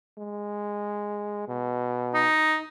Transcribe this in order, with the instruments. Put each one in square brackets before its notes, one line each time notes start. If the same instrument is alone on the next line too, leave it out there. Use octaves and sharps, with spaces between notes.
[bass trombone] G#3
B2
[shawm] D#4